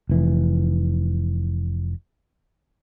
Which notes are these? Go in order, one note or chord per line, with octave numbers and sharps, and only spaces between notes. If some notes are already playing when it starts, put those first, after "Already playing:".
F1 E3